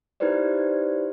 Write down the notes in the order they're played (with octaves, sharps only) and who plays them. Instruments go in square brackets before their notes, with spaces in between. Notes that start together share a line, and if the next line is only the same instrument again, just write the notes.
[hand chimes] D#4 E4 G4 B4 C5 D5